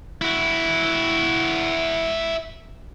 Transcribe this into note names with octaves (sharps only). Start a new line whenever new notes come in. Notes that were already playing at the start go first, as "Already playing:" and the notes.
E4 F#4